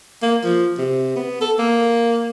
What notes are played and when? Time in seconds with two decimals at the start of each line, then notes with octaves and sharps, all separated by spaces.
0.22 A#3
0.44 F3
0.78 C3
1.16 B3
1.41 A4
1.59 A#3